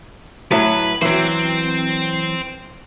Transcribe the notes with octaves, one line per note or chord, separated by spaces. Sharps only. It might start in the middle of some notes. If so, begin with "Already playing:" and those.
A2 F#3 E4 B4
E3 F#3 C4 C5